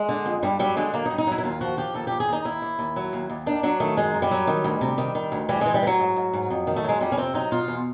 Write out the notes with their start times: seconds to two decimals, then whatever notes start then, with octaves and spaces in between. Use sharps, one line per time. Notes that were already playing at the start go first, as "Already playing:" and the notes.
Already playing: G#3
0.09 D3
0.26 F2
0.43 G2 G3
0.59 F#3 G3
0.76 D3 G#3
0.93 F#3 A#3
1.06 D#4
1.11 G2
1.18 D#4
1.27 F#3 E4
1.38 E4
1.44 D#2 F4
1.61 F3 F#4
1.77 F3 G4
1.94 D#2 A4
2.07 D#2 G4
2.20 G#4
2.29 D#2 D#4
2.45 D#2 E4
2.62 D#2
2.79 D#2
2.96 F#3
3.13 D#2
3.29 D#2
3.46 D#3 D4
3.63 F#3 D4
3.80 D#3 A3
3.97 F#2 G#3
4.14 F#2
4.22 G3
4.31 F#3
4.47 D#3
4.64 D2
4.81 C3
4.98 D#3
5.15 D#3
5.32 D2
5.49 E3 G3
5.61 E3 G#3
5.74 G3
5.83 E3
5.87 F#3
6.00 G#2
6.16 G#2
6.34 G#2
6.50 F2
6.67 D#3
6.76 A3
6.84 F#3 G#3
7.01 F2 G3
7.12 C#4
7.17 C3 C4
7.34 F#3 D#4
7.51 B2 F4
7.68 E2